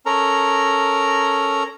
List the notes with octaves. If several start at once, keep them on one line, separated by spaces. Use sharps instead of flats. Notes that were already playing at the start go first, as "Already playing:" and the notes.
C#4 A4 A#4 A#5